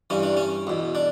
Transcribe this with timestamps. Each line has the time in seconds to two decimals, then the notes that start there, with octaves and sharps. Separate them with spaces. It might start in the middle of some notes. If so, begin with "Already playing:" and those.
0.10 G2 E3 C#4
0.23 D4
0.37 C#4
0.67 E2 B2
0.95 D4